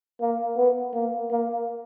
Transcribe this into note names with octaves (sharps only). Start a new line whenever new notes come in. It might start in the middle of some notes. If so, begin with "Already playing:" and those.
A#3
B3
A#3
A#3